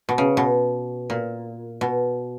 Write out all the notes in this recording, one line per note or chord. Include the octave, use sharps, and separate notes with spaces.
B2
C#3
B2
A#2
B2